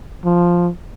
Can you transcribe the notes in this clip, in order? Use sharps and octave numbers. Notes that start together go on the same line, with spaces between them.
F3